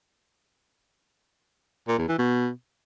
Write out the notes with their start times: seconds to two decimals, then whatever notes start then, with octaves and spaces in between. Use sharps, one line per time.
1.88 A#2
1.98 E2
2.09 E3
2.19 B2